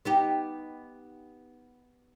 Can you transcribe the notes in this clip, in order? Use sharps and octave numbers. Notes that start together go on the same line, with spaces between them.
B3 D#4 G4